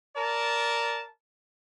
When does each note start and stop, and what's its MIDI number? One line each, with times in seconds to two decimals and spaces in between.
0.16 1.05 70
0.16 1.05 74
0.16 1.05 81